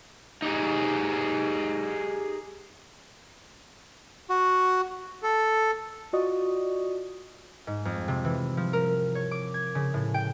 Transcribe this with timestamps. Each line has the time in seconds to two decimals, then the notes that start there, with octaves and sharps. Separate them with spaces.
0.42 D#4 G4 G#4
4.30 F#4
5.23 A4
6.13 F4 F#4 D5 D#5 C#6 D#6
7.67 G#2
7.85 F2
8.08 C3
8.24 E3
8.57 F3
8.73 A#4
9.15 C#5
9.31 D6
9.54 G#6
9.75 C#3
9.94 A2
10.14 G5